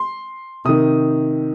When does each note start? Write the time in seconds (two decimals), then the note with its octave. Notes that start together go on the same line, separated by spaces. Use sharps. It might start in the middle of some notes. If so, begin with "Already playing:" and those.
Already playing: C6
0.65 C3 D#3 D#6